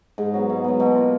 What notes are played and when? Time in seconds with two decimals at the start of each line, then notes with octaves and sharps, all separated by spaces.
0.18 G#2
0.34 F#3 B3
0.50 G#2
0.64 F#3 B3
0.80 B2
0.95 A#3 F4